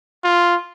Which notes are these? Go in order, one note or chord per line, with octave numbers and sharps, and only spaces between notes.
F4